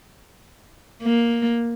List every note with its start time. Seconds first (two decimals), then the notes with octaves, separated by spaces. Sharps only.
1.02 A#3